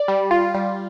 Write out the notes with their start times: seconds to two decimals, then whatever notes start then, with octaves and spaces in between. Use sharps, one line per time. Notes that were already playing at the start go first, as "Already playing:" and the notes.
Already playing: D5
0.08 G3
0.31 F4
0.55 G3